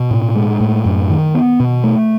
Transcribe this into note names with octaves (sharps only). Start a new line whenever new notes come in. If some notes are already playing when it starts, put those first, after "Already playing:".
Already playing: B2
A2
G#3
A2
F#2
D#3
B3
B2
A3